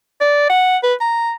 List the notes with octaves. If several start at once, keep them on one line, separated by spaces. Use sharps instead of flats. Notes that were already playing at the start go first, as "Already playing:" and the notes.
D5
F#5
B4
A#5